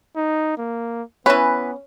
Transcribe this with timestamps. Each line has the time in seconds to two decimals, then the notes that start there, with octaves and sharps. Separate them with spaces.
0.16 D#4
0.57 A#3
1.26 E3 B3 C#4 B4